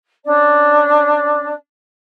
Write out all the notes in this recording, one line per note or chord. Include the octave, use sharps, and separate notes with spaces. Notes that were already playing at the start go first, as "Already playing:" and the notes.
C#4 D4 D5